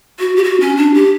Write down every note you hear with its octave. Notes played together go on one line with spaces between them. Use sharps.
F#4
G4
F#4
C#4
D4
G4